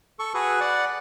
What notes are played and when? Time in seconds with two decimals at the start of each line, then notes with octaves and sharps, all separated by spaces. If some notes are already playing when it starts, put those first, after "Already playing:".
0.19 A4 C#6
0.34 F#4 G#4 B4
0.60 D5 F#5